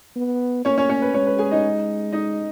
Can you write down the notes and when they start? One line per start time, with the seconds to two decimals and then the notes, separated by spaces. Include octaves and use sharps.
0.16 B3
0.65 A#3 C#4 C#5
0.78 C#4 C#5
0.89 C#4 C#5
1.02 B4
1.14 G#3 C#4 C#5
1.27 B4
1.39 G#4 G#5
1.51 D#4 D#5
2.13 D#4 D#5